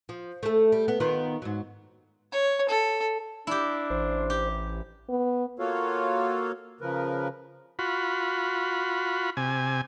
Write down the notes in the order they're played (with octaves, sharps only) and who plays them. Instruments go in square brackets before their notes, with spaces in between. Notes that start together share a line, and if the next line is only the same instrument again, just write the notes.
[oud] F3
A3 A4
G3
B3
D#3 B3 F4
G#2 F#3
[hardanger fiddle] C#5
A4
[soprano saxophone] D4 [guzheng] E4 G4
[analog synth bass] A1 [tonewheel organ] C5
[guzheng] G4
[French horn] B3
[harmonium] A#3 F4 F#4 A4 C#5 F5
C#3 F3 A#4 B4
[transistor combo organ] F4 F#4 B5
C3 G#5